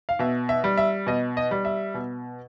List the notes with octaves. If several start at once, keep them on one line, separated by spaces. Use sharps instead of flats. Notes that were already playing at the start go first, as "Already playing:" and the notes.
F5
B2 E5
E5
G3
E5
B2 D#5
D#5
G3
E5
B2